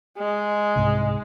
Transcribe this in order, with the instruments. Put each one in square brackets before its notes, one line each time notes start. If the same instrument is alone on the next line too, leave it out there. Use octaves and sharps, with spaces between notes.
[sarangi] G#3
[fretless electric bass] C2 G#2